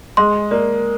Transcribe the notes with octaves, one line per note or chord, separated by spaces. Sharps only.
G#3 C6
A#3 D5